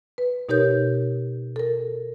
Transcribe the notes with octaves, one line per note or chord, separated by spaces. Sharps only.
B4
B2 D#4 G4 A#4 C#5 G6
A4 A#4